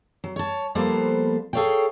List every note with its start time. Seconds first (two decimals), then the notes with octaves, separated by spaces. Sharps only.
0.24 F#3
0.36 C#5 A5
0.75 F3 G3 A#3 B3 A4 C5
1.53 G#4 A4 B4 C#5 F5 G5